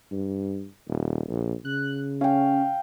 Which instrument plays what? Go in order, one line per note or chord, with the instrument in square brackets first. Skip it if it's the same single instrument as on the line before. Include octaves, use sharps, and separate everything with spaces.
[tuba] G2
D#1
A#1
[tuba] C#3 [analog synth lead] F#6
[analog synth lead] C#4 [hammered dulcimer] F5 G5